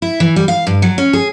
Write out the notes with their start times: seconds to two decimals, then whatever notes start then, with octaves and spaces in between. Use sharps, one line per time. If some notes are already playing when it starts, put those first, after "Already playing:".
0.02 E4
0.20 E3
0.36 G3
0.48 F5
0.67 G2
0.82 F#3
0.98 C#4
1.13 G#4